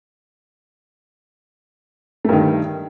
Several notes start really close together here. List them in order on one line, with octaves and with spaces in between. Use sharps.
A3 G2 D#3